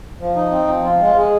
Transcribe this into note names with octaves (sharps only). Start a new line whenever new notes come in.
F3
D#4
C4
F3
F4
G#3
G#3